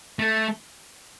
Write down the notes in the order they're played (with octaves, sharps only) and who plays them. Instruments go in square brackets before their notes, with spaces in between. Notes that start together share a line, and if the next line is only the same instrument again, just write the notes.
[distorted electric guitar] A3